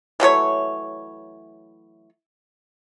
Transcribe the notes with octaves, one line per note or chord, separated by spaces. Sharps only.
E3 F#3 A3 C#5